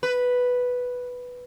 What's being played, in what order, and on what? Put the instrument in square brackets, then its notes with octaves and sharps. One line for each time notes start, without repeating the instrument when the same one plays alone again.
[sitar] B4